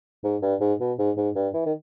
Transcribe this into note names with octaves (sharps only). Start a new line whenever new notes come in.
G#2
G2
G#2
B2
G#2
G#2
G2
E3
D#3